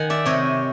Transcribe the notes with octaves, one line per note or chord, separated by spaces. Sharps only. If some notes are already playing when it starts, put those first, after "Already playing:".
Already playing: D#3 F#5 G#5
D5 E5
C3 C#5 D#5